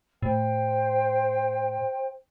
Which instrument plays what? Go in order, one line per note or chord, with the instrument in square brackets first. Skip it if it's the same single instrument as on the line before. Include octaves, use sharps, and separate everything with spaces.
[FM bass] A2 [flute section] C5 G5